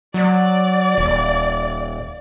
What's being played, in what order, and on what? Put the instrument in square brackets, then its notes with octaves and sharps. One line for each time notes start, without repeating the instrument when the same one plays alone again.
[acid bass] F#3 [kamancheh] D5
[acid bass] D#1